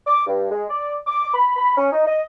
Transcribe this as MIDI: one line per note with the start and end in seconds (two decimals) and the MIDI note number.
0.07 0.23 86
0.27 0.47 43
0.51 0.65 56
0.70 0.94 74
1.07 1.31 86
1.34 1.53 83
1.56 1.75 83
1.77 1.89 61
1.92 2.07 63
2.07 2.22 75